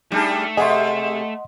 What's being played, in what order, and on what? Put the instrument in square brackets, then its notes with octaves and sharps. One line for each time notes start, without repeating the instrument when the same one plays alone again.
[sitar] G3 D4 G#4 [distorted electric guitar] A3 [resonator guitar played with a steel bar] D#4
[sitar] C3 G#4 [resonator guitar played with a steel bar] A4 E5 G#5 [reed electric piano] D#5 F#5 C6